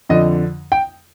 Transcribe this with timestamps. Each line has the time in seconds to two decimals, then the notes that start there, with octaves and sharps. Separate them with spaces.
0.09 F2 D3 F3 D#5
0.72 G5